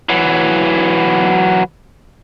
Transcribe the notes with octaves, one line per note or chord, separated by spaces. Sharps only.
E3 F#3